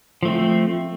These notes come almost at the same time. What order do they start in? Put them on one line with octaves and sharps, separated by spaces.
F3 A3 C4